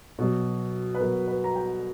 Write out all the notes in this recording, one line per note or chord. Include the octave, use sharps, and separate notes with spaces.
B2 F#3
B4
B2 F#3 A#4
B4
A#5
G5